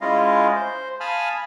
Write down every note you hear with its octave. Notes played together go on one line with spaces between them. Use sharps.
G#3 C#4 E4 F4 D#5 F5
C5
F5 G#5 A5 B5 D#6 F6